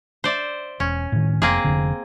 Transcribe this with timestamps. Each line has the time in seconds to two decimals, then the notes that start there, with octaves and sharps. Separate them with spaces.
0.24 C5 D5 E5
0.80 E1 C#4
1.12 A2 D#3
1.42 F1 A#3 C4 G#4
1.64 F1 A#1 D3